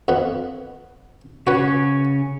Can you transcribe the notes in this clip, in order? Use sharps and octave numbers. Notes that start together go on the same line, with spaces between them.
F2 B3
C#3 C#4 F#4 B4 C#5